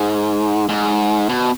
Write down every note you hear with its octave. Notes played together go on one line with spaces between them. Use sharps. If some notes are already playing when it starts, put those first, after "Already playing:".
Already playing: G#2
G#2
B2